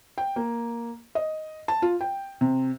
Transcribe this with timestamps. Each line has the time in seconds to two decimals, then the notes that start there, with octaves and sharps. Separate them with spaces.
0.18 G5
0.36 A#3
1.15 D#5
1.68 A5
1.82 F4
2.01 G5
2.41 C3